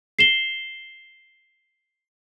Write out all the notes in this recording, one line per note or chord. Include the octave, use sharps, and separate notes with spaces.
C7 E7 G7